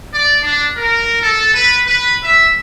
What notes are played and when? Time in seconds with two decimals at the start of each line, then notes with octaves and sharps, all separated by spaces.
0.13 D5
0.42 D4
0.76 A#4
1.21 A4
1.53 B4
1.87 B4
2.24 E5